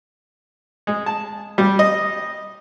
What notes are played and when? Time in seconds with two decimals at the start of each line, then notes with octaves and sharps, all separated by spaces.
0.87 G#3
1.06 A5
1.58 G3
1.79 D#5